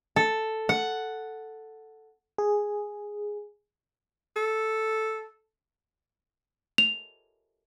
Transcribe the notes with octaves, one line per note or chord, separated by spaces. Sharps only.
A4
F#5
G#4
A4
F7